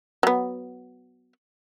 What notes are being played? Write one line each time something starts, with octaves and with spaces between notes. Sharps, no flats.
F#3 B3